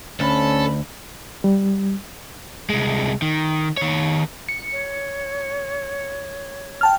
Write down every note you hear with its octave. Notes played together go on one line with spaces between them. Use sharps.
D2 C#4 A4 B5
G3
C2 G#3
D#3
D#3 C#5
C#7
C#5
G5 A5 F6